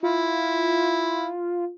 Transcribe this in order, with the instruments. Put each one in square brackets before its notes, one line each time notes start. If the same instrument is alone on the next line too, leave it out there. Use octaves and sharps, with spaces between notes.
[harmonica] E4 [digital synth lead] F4